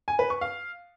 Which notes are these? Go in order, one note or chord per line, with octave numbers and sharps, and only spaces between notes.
G#5
B4
C#6
F5